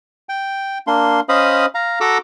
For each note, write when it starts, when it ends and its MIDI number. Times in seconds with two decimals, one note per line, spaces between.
0.29 0.78 79
0.87 1.20 58
0.87 1.20 62
0.87 1.20 84
1.29 1.66 61
1.29 1.66 72
1.29 1.66 75
1.29 1.66 77
1.29 1.66 83
1.29 1.66 87
1.75 1.99 77
1.75 1.99 82
2.00 2.18 66
2.00 2.18 69
2.00 2.18 82
2.00 2.18 86
2.00 2.18 88